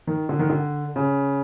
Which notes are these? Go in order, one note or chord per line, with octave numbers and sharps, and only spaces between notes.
D#3
D3
D#3
D3
C#3